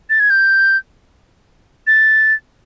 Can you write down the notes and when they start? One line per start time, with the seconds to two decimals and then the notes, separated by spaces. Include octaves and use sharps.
0.10 A6
0.20 G#6
0.30 G6
1.87 A6